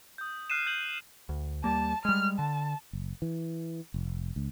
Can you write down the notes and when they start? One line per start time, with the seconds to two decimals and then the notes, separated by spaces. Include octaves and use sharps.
0.18 D#6 G6
0.50 F6 F#6 C7 D#7 E7
0.67 G6 D#7 F#7
1.29 D2
1.64 D#2 G3 A#3 A5
2.05 G3 G#3 F6
2.39 D3 A5
2.93 F#1
3.22 E3
3.94 F1
4.36 C#2